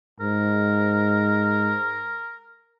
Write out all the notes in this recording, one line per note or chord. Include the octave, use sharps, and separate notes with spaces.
G#2 A#4